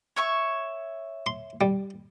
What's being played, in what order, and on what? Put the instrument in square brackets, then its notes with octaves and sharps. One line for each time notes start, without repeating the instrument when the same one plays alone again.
[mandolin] C#5 E5 C#6
[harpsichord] C6
G3